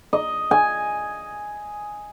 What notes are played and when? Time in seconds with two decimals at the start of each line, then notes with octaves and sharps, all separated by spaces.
0.13 D#5
0.51 G#5